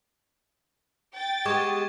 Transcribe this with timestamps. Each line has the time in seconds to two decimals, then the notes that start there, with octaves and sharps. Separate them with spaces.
1.15 G5 A6
1.45 G#3 B3 G4 C#6 D6 G#6